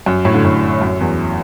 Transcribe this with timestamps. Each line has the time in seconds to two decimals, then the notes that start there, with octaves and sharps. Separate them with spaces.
0.06 F#2
0.25 A2
0.34 D3
0.45 A2
0.82 F#2
1.01 E2